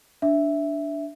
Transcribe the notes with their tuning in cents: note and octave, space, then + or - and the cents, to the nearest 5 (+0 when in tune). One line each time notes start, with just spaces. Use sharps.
D4 -5 E5 +0